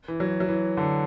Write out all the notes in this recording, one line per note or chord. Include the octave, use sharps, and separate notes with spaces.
E3
F#3
F#3
E3
D3